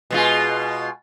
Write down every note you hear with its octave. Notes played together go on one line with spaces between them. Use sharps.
B2 G#3 F4